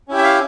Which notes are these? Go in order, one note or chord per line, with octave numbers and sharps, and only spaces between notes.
C#4 E4 G4
E5
F5